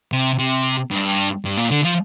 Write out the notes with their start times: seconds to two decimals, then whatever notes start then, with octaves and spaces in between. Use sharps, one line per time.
0.12 C3
0.39 C3
0.91 G2
1.45 G2
1.57 A#2
1.71 D3
1.84 F3